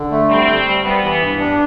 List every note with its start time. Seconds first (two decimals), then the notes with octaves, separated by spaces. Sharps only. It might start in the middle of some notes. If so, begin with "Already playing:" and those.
Already playing: D3
0.11 A3
0.29 G3 C4
0.48 G3
0.65 G3
0.83 G3 B3
1.02 E3
1.21 G2
1.39 D4